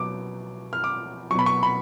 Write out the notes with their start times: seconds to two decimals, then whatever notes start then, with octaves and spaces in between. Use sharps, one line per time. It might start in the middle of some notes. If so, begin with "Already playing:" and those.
Already playing: B2 F#3 D6
0.73 F6
0.84 D6
1.30 F#3 C#6
1.35 B2 B5
1.46 C#6
1.63 B5